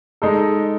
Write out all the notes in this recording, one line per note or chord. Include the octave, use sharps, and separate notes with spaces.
G#3 D#4 A4